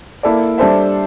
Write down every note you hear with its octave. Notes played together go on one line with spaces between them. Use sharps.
A#3 E4 A4 D5
G3 D4 A4 C5 E5